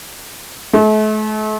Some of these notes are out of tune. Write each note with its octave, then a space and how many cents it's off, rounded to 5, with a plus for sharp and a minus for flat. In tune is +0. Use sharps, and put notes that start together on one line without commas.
A3 -40